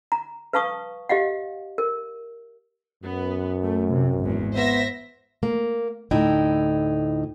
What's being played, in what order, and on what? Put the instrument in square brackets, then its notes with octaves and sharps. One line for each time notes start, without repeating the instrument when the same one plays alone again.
[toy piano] A#5
B4 F5 A5 C#6 D#6
G4 D#5 F5 F#5
A#4
[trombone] F#2 [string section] B3
[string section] A3
C3
G#1 E2
[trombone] B3 [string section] C5 E5 A#6
[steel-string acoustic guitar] A#3
D2 A2 D#4 E4 G5